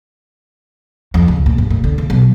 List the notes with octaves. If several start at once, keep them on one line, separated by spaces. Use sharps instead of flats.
F2
C#2
A#2
G2
A#2
D3
C#2
B1